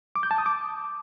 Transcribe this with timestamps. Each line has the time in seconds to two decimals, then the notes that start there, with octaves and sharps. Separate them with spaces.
0.16 D6
0.23 G6
0.31 A5
0.38 D#6
0.46 D6